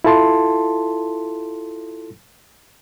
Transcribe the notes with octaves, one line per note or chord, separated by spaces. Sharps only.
E4 F4 A4 A5 C6